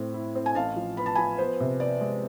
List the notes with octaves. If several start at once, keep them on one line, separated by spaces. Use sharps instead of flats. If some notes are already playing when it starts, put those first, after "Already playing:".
Already playing: A2 C4
E4
C4
G#5
A1 F5 A5
F3
B3 B5
A5
F3 G#5 B5
B3 C5
C3
B3 D5
G#3